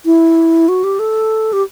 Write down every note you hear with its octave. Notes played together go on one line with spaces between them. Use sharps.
E4
F#4
G4
A4
G4